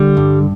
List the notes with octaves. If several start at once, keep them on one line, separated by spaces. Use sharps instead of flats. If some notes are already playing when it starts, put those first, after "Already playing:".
Already playing: D3 G3
G2